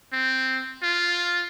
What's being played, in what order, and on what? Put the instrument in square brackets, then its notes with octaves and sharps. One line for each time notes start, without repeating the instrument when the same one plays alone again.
[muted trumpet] C4
F4